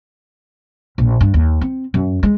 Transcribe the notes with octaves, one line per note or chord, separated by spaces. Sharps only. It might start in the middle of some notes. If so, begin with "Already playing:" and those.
A#1
G2
D#2
C4
F#2
G#3